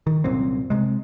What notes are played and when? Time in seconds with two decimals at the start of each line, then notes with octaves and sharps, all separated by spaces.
0.07 D#3
0.24 C2 F#2 A#2 C4
0.70 C3 G#3